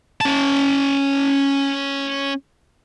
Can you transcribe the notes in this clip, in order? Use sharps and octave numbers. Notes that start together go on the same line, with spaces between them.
C#4 A5